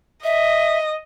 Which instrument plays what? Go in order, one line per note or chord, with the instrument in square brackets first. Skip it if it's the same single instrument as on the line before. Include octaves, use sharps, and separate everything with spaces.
[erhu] D#5 [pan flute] E5